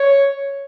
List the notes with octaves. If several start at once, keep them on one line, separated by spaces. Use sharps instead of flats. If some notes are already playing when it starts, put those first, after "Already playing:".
Already playing: C#5